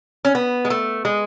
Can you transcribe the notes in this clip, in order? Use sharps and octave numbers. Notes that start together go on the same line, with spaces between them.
C#4
B3
G#3
A3
G#3